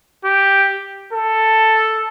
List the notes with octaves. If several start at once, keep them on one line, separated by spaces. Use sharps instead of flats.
G4
A4